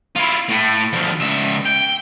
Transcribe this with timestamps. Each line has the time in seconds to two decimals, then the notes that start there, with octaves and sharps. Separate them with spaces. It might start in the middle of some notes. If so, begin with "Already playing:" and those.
0.16 E4 F4
0.49 A2 A3
0.93 D2 F3
1.20 C#2 E5
1.66 G5